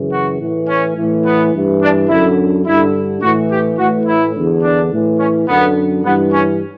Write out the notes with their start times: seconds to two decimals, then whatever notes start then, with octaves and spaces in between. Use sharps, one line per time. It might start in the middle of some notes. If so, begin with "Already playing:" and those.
Already playing: F#2 C#3 E3
0.12 F#4
0.41 A2 E3
0.68 C#4
0.97 A2 E3
1.25 B3
1.54 G2 E3
1.82 D4
2.09 F#2 D3 E4
2.66 G2 D3 E4
3.22 A2 E3 F#4
3.51 G4
3.78 A2 E3 F#4
4.06 E4
4.35 E2 D3
4.63 D4
4.92 A2 E3
5.19 C#4
5.48 F#2 D3 B3
6.04 G2 E3 B3
6.32 C#4